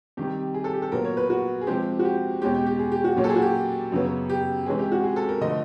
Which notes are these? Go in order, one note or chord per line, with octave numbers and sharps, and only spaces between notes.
C3 D#3 G3 G4
G#4
A4
G4
A4
A#2 F#3 B3 A#4
C#5
B4
F#4
G#4
C3 F3 G#3 C4 G4
F#4
G4
E2 B2 G#3 C#4 G4
G4
G4
G#4
G4
F#4
A#2 F#3 A#3 C#4 G4
A4
G#4
F#4
G4
F#2 C#3 F#3 B3
G4
C3 E3 G#3 C#4 G#4
G4
F#4
G#4
A4
A#4
D3 F3 A3 D#5